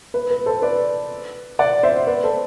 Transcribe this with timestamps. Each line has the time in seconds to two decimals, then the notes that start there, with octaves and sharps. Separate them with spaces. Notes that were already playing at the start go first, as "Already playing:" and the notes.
0.14 B4
0.31 B4
0.46 A4 C5
0.62 B4 D5
1.59 D5 F#5
1.83 C5 E5
2.07 B4 D5
2.23 A4 C5